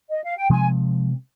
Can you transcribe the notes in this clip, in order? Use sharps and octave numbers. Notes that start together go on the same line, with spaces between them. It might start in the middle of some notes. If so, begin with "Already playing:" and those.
D#5
F5
G5
C3 F3 G#3 C4 G#5